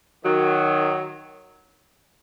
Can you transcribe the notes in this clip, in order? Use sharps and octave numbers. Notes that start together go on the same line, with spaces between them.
D#3 F#3